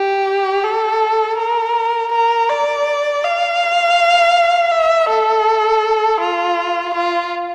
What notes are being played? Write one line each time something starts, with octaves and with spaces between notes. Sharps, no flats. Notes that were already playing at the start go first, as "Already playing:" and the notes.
Already playing: G4
A4
A#4
A#4
D5
F5
E5
A4
F4
F4